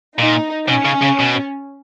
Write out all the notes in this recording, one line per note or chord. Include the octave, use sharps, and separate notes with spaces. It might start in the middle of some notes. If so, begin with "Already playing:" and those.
A#2 D#4
B2 C#4
C#3
C#3
B2